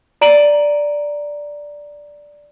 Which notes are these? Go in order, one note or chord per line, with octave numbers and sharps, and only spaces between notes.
D5 A#5 D7 D#7 F#7